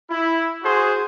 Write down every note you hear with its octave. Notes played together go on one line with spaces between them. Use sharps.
E4
F#4 G#4 C5